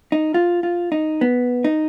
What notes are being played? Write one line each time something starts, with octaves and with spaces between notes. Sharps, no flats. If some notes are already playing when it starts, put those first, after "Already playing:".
D#4
F4
F4
D#4
B3
D#4